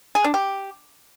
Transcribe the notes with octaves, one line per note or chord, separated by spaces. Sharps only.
G#4
D4
G4